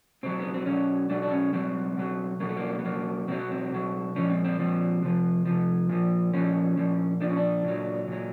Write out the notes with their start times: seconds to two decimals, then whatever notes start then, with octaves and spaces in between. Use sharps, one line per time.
0.23 B2 F#3 C4
0.40 B3
0.54 C4
0.66 B2 F#3 C#4
1.10 B2 F#3 D4
1.22 D4
1.31 C#4
1.53 B2 F#3 C4
1.96 B2 F#3
2.40 B2 F#3 A#3
2.49 A3
2.57 A#3
2.79 B3
2.84 B2 F#3 A#3
3.28 B2 F#3 C4
3.39 B3
3.51 C4
3.72 B2 F#3
4.16 A#2 F3 C#4
4.30 C4
4.44 C4
4.59 A#2 F3 C4
5.02 C3 F3
5.46 C3 F3
5.89 A#2 F3
6.34 A#2 F3 C#4
6.77 A#2 F3
7.21 F3 D4
7.24 A#2
7.29 C#4
7.37 D4
7.64 A#2 F#3
8.08 A#2 F#3